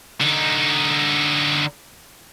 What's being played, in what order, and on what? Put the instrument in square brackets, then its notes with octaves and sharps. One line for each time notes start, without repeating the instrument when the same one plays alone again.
[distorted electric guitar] D3 D#4